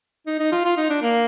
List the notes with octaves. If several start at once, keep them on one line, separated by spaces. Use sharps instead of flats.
D#4
D#4
F4
F4
D#4
D4
A#3